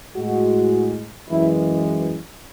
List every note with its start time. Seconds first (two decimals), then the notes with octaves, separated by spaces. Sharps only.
0.17 A2 G#3 F#4
1.29 F#2 E3 G#3 E4